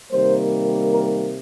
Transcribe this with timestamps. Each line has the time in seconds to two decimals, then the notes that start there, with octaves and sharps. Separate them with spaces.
0.11 C3 D#3 G3 A#3 C5
0.91 A#4